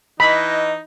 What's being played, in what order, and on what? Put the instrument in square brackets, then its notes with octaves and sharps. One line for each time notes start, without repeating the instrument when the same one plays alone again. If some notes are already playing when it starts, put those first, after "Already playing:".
[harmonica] E3 D#4 [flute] D#5 [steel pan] B5